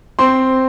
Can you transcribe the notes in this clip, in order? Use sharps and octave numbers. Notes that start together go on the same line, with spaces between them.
C4 C6